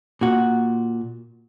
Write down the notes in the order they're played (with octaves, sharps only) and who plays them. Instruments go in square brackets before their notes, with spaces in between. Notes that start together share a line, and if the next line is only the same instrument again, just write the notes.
[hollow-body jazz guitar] A#2 F#4